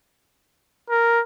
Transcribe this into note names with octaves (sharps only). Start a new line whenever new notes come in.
A#4